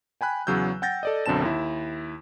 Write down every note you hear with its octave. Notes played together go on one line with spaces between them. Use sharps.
G5 G#5 B5 F#6
E2 C#3 F#3 E6 G6
F#5 G5 G6 A6 A#6
A4 D5 D#5
B1 F#2 D3 C4 A5 E7
D#2 E4